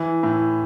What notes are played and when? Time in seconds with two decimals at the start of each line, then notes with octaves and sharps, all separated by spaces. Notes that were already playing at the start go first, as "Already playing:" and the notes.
Already playing: E3
0.23 A2